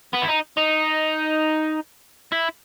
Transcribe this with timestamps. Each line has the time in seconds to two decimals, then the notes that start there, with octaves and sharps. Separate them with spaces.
0.13 B3
0.22 E4
0.28 D#4
0.57 D#4
2.32 E4